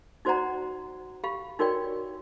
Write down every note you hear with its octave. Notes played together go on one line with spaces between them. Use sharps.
D#4 F#4 C5 D5 F#5 A#5
G4 F5 B5
D#4 F#4 A#4 C#5 D5 G5